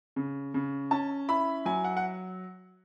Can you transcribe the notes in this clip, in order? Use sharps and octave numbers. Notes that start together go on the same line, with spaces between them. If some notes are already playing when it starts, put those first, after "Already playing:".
C#3
C#3
C#4 A5
E4 B5
F#3 G#5
F#5
F#5